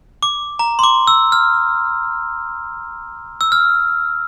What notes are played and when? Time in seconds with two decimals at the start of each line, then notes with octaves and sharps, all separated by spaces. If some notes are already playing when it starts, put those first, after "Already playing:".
0.23 D6
0.59 A#5
0.79 C6
0.83 D6
1.07 E6
1.32 F6
3.41 E6
3.52 F6